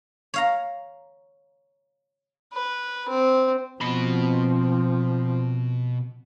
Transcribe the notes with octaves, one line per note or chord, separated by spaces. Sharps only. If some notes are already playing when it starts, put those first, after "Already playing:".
C#5 F5 A#5
B4
C4
B2 F3 C4 B5